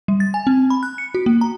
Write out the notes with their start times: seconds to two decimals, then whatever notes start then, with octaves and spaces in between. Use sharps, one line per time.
0.08 G3
0.20 A6
0.34 G#5
0.47 C4
0.70 B5
0.83 F#6
0.98 C#7
1.15 F#4
1.26 A#3
1.41 A#5